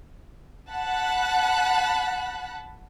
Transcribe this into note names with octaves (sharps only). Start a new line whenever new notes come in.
F#5 A5 B5 F#6